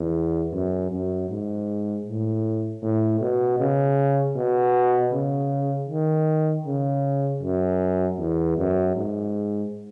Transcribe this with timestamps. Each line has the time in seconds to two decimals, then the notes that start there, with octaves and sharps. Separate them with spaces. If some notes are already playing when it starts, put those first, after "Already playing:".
Already playing: E2
0.53 F#2
0.92 F#2
1.30 G#2
2.06 A2
2.83 A2
3.21 B2
3.60 C#3
4.36 B2
5.13 C#3
5.89 D#3
6.66 C#3
7.43 F#2
8.19 E2
8.58 F#2
8.96 G#2